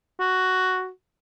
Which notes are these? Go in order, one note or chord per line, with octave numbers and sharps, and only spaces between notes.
F#4